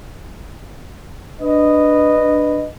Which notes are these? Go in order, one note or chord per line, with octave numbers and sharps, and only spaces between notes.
D4 B4 D#5